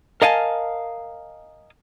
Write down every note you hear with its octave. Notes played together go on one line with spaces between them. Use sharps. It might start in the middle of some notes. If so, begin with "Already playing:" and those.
A#4 D#5 F5 G#5 A5